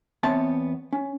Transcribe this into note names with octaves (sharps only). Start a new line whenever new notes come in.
E2 B3 C4 C#5 E5 A5
C#4